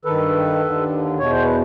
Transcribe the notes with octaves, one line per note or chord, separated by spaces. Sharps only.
G2 D#3 A4 B4
D#2 D3
E2 B2 C#5
C5
B4